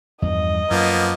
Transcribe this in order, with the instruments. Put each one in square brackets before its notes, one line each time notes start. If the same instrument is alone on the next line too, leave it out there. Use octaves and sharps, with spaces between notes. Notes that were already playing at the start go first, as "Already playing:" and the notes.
[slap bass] E2 G2 F3 [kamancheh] D#5
[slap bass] F#2 [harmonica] F3 A#3 B3